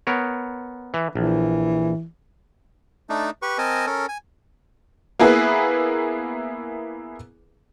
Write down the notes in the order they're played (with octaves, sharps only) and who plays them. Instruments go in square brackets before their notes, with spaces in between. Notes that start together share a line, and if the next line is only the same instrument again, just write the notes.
[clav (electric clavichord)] B3 A#4 C#5
E3
[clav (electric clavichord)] A#1 [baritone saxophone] E3
[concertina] A3 D4 D#4
G4 B4 C#6
C4 A#4 D#5 G#5 A5
C#4 A4 A#4
G#5
[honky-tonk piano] A#3 B3 E4 G#4 B4